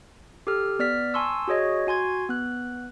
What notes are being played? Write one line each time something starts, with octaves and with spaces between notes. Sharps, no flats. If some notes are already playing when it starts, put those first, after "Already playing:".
G4 A4 F6
B3 D5 F6 B6
G#5 A5 C6 C#6 E6
F#4 G#4 C#5 D#5
F#4 G#5 C6 G#6
B3 F#6